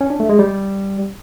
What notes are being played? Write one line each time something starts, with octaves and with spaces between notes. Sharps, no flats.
C#4
D4
A3
G#3
G3